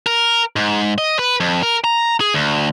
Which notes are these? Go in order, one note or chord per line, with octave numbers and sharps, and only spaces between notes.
A#4
G#2
D#5
B4
F2
A#4
A#5
G#4
D2